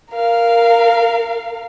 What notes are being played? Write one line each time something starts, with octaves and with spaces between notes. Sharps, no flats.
A#4 F5